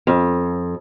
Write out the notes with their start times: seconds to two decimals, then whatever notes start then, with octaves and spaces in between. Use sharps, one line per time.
0.07 F2